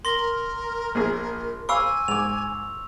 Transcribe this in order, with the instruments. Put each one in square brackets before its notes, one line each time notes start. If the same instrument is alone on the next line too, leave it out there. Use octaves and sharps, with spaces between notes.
[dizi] A#4 [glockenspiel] C6 A#6 G7
[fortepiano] A#1 G#4
[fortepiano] F5 B5 D6 [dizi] G#5 [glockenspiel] C#6 E6
[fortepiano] G#2 D6 [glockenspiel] F7